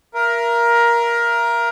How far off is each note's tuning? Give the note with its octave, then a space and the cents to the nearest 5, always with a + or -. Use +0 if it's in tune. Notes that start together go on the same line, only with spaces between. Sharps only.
A#4 +15 E5 +40